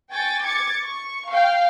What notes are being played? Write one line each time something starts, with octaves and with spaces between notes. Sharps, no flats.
G5 G#5 C#6 A6
D6 G#6 A6 C#7
C#6
F5 G5